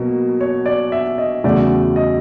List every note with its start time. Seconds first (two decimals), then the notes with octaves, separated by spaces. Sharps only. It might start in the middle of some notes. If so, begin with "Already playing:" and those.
Already playing: B2 F#3 A#3
0.41 C#5
0.66 D5
0.92 E5
1.18 D#5
1.44 E2 C#3 F#3 A3 D5
1.96 D#5